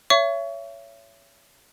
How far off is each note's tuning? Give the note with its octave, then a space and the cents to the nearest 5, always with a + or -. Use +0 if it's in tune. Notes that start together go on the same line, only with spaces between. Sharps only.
C#5 +15 E5 +30 C#6 +25